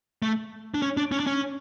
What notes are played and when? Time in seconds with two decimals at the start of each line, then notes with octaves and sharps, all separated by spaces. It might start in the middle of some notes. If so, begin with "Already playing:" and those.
0.22 A3
0.74 D4
0.82 C#4
0.97 D4
1.12 C#4
1.20 D4
1.27 C#4